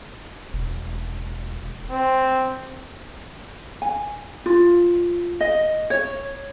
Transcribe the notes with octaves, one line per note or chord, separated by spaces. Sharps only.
E1
C4
G#5
F4
D#5
C#5